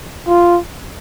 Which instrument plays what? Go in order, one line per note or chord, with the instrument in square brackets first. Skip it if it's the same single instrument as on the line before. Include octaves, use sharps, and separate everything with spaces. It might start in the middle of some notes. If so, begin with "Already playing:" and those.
[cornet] F4